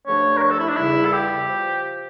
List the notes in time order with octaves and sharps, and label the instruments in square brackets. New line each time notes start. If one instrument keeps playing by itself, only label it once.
[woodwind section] G2 D3 F3 A3 D4 [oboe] C#5
[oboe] A#4
C#5
A4
E4
D4
[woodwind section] E2 C#3 G3 [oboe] E4
[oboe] A4
G4
[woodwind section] F3